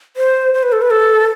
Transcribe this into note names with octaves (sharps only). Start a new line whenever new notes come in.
C5
C5
B4
A4
B4
A4